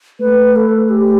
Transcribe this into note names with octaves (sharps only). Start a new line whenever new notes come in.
A3 B4
A4
G4